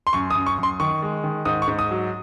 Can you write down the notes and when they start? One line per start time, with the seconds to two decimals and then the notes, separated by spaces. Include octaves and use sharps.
0.07 C6
0.13 F#2 C#6
0.31 D#6
0.35 F#2
0.46 C#6
0.58 F#2 C6
0.80 D#3 C#6
1.02 G#3
1.24 D#3
1.45 G#2 D#6
1.62 C#6
1.68 G#2
1.79 D#6
1.91 F#3